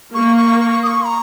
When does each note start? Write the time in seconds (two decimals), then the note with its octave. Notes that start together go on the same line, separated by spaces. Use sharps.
0.14 A#3 C#6
0.37 C#6
0.60 C#6
0.83 D#6
0.88 C#6
1.06 A#5